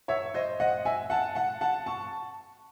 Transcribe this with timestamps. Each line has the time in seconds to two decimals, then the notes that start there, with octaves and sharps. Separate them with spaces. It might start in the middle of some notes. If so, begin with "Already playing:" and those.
0.08 C#5 E5
0.34 C5 D#5
0.60 D#5 F#5
0.85 E5 G#5
1.10 F#5 A5
1.35 F#5 A5
1.61 F#5 A5
1.86 A5 C#6